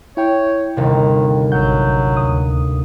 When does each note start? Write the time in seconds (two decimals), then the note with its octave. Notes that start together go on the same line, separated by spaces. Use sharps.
0.17 E4 C#5 G5
0.76 G1 D#2 C3 D#3
1.52 A1 F#3 F#5 G6
2.17 D2 D#6